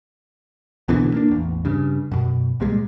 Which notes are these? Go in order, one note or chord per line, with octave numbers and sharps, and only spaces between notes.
B1 B2 D3 E3
A#3 D4
A1 E2
G2 C#3
F#2 B2
C2 A#2 G3 G#3